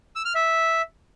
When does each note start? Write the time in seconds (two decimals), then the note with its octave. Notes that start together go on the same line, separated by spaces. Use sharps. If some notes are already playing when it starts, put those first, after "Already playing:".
0.16 E6
0.25 F6
0.35 E5